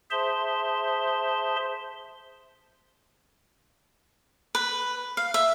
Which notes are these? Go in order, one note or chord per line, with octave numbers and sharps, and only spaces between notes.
G#4 C5 E5 A5 C6
B4
F5
E5